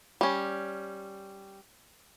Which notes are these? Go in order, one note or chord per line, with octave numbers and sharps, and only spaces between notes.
G3 C#4